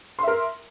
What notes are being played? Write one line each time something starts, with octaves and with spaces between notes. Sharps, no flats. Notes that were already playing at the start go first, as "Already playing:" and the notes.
A#4 E5 C6